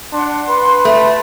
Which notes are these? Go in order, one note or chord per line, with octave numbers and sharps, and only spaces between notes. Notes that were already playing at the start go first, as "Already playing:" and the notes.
D4 F#5 C6
B4
A3 F#4 C6